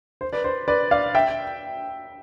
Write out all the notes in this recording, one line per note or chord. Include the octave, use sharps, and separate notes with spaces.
C5
B4 D5
C5
B4 D5
D5 F5
E5 G5